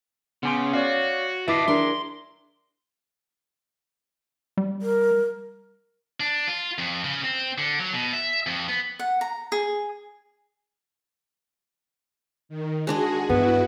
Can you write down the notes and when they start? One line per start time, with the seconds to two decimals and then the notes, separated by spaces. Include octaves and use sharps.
0.43 C#3 B3 C#4 C6
0.73 F#4 C#5 D5 F5
1.48 E4 B4 D#5 E5 A5 D6 C7
1.68 D4 G#4 A#4 C6
4.57 G3
4.82 A#4
6.20 D4
6.47 F4
6.78 F2
7.04 C#3
7.24 C4
7.58 D3
7.80 F#3
7.93 B2
8.13 E5
8.47 F2
8.69 B3
8.99 F#5
9.21 A#5
9.52 G#4
12.49 D#3
12.87 G#3 D4 F#4 G#4 D#5
13.29 G2 B3 E4 F#4